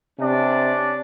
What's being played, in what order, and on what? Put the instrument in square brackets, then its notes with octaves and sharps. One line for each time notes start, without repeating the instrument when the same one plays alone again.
[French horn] C3 [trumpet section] C#4 D4 D5